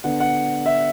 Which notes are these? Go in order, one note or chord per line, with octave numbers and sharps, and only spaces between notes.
D3 B3 D4 F#5
F#5
E5